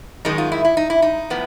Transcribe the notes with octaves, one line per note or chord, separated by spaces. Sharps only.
F#2 D#3 G#3 D#4
F4
E4
E4
D#4
E4
D#4
A2 F3 B3